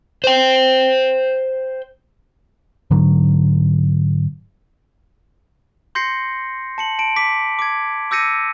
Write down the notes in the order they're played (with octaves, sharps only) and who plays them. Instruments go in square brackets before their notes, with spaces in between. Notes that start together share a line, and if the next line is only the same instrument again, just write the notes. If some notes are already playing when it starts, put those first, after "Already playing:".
[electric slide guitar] C5 G5
[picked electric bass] G#2 D3 F#3
[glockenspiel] C6 G6 A#6 C7 C#7
A5 C#7 F#7
A5 D7
D6 B6
D6 G#6
D6 E6 G6 A#6 C#7 D#7